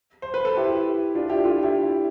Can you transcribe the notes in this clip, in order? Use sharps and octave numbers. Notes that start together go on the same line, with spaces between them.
C5
B4
A4
E4 G4
D4 F4
E4 G4
F4 A4
E4 G4